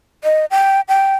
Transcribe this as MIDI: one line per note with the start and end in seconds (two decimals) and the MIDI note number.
0.24 0.46 75
0.51 0.81 79
0.88 1.17 79